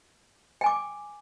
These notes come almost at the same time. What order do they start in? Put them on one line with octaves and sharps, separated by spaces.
G5 G#5 D6